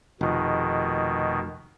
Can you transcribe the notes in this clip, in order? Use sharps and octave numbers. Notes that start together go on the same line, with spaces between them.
F1 B2 D#3